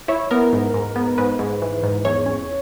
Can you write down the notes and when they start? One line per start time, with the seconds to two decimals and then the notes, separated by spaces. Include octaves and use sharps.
0.08 E4 C#5
0.31 B3 A#4
0.53 G#2
0.74 G#2
0.96 B3
1.18 G#2 B4
1.39 G#2
1.62 E3
1.83 G#2
2.05 E2 C#5
2.26 C#4